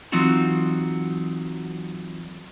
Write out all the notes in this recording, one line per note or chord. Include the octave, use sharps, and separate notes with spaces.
E3 F#3 C4 D#4 F4 F#4